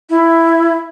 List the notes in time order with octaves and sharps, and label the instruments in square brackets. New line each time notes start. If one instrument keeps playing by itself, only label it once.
[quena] E4